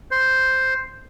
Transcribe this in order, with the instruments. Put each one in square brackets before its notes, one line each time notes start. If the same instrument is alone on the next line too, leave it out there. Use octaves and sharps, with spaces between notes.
[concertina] C5